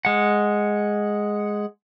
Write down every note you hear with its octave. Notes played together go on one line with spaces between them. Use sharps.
G#3 F#5